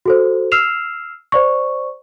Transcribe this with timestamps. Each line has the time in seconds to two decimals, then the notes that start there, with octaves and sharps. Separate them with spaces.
0.06 F#4 A4 C5
0.52 E6 F6 C7 E7 F7
1.32 C5 D5 C#6